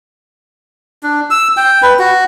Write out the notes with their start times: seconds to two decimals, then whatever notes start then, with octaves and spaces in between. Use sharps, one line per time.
1.03 D4
1.30 E6
1.57 G5
1.82 B4
1.99 F#4